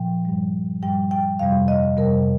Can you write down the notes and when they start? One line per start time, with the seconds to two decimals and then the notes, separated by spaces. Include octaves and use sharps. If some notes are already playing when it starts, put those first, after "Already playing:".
Already playing: A#2 F3 G5
0.25 G2 G3
0.83 G2 G3 G5
1.11 G5
1.39 F2 C3 G3 F5
1.68 D#5
1.97 F2 C3 G3 A#4